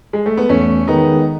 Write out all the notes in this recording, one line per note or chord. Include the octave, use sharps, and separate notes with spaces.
G#3
A3
B3
E2 A3 C#4
D#3 G#3 B3 D#4